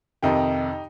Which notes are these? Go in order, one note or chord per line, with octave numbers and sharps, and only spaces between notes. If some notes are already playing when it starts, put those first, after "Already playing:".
F2 C3 D#3 D#4 G4